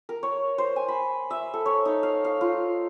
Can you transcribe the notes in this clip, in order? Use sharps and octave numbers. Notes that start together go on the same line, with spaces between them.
A#4
C#5
C5
G#5
B5
E5
A4
C#5
D#4
F5
F5
F4